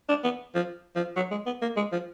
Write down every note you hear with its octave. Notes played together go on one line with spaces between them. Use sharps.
D4
B3
F3
F3
F#3
G#3
B3
A#3
G#3
F3